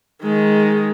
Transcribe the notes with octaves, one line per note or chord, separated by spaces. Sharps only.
D#3 G#3